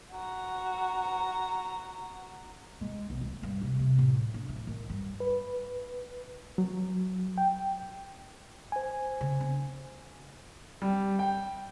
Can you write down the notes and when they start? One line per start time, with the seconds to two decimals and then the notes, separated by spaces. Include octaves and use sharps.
0.12 F#4 A#5
2.81 G#3
3.10 B1
3.21 A3
3.43 G2
3.61 C3
3.79 C3
3.99 A2
4.34 D4
4.49 A3
4.67 D#3
4.90 G2
5.20 B4
6.58 F#3
7.38 G5
8.72 C5 G#5
9.21 C#3
9.40 D4
10.82 G3
11.19 G5